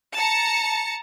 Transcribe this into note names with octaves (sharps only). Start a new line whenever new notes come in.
A5 A#5 C#7